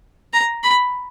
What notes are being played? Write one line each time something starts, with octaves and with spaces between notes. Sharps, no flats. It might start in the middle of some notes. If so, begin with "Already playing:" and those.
A#5
B5